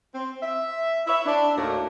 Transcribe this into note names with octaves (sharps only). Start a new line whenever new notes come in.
C4
E5
E4 B4 C#5 E5
D4
D#2 A2 A#3 D#4 F#4 A#4